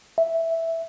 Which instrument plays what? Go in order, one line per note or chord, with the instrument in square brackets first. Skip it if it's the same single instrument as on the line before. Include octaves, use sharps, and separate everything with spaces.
[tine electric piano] E5